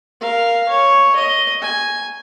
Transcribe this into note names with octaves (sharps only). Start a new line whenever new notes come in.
A#4 F5
C#5
D#5
G#5